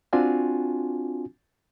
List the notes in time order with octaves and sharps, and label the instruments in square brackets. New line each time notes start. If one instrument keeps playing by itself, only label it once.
[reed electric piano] C4 D4 F4 F#4 G#5